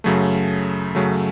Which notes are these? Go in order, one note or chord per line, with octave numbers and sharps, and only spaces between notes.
F#2 C#3 F#3 A3
F#2 C#3 F#3 A3